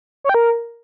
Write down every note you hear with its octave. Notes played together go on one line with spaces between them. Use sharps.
C#5
G5
A#4